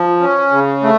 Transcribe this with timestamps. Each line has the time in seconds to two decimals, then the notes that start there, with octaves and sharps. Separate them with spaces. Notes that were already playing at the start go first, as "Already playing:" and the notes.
Already playing: F3
0.20 C#4
0.51 C#3
0.83 A3